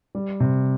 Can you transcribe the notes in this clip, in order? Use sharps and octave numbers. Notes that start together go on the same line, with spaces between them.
G3
C3